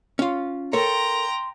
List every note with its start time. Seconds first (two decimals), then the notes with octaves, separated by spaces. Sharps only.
0.19 C#4 F4
0.73 A4 A#4 C#5 G5 A#5 C6